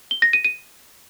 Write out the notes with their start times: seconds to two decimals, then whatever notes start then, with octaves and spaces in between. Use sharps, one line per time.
0.11 G7
0.22 A#6
0.33 D#7
0.45 D#7